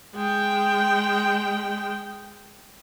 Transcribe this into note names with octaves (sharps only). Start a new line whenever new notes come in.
G#3 G5